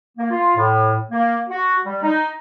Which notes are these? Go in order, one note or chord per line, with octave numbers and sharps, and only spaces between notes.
A#3
F4
A2
A#3
F#4
G3
D#4